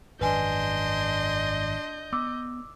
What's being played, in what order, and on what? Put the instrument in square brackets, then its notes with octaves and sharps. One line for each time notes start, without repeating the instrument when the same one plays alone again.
[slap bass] G#1 F#2 [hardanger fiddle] D4 C6 [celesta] B4 G#5 [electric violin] D#5 G6
[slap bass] B3 [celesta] D6 E6